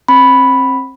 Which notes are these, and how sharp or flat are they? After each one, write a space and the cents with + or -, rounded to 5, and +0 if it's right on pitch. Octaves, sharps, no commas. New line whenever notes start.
C4 +30 B5 +0